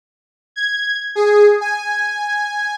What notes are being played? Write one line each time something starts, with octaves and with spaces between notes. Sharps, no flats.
G#6
G#4
G#5